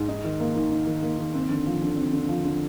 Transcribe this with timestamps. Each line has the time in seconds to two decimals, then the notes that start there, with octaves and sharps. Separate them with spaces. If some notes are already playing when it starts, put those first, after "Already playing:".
Already playing: G#2
0.08 D#4
0.25 D#3
0.40 A#3
0.56 D#3
0.71 D#4
0.87 D#3
1.03 A#3
1.18 D#3
1.34 C4
1.50 D3
1.66 F3
1.82 D3
1.97 C4
2.13 D3
2.28 F3
2.45 D3